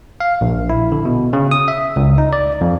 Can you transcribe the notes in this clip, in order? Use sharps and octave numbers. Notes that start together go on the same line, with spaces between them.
F5
A#1
E4
D3
B2
C#3
D#6
E5
C#2
D#4
D5
F2